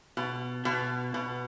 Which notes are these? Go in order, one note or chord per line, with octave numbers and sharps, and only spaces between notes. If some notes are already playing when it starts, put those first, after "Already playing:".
B2
B2
B2